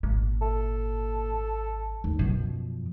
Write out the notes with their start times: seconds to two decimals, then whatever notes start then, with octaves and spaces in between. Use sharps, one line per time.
0.03 G#1 A#2
0.42 A4
2.04 D#2
2.19 F#2 B2 F3